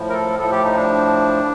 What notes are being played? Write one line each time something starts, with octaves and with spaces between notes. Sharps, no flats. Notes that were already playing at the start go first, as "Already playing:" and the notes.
Already playing: A2 F3
A#4
A4
A2 F3 A4
G4
D#4
D4